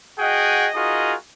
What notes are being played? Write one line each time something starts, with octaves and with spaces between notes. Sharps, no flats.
F#4 G#4 D#5 F#5 G5
D#4 F4 F#4 G#4 A#4 D#5